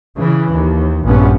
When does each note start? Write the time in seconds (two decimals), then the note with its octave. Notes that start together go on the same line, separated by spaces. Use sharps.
0.17 C#3 E3
0.53 D#2
1.04 A#1 G2 B3 C#4